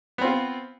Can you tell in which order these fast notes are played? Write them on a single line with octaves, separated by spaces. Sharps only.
B3 C4 F4